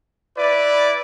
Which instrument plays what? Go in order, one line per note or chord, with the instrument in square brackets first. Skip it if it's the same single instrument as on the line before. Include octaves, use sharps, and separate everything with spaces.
[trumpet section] E4 B4 D5